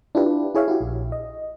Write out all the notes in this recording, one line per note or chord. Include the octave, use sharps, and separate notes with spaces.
D4 E4 F4 G4 B4
E4 G#4 C#5 E5 F5
E4 F#4 G4
A#1
D#5